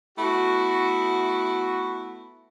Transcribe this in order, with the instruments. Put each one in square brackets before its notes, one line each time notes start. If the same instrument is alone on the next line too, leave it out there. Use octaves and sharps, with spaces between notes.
[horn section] A3 B3 E4 F#4